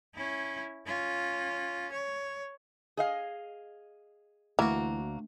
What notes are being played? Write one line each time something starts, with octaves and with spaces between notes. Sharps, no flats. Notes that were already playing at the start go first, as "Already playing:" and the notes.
C#4 E4
C#4 F4
C#5
G#4 D#5 F5
D2 E3 A#3 F#4